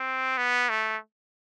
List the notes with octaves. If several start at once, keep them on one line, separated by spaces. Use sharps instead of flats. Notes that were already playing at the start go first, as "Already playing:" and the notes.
Already playing: C4
B3
A3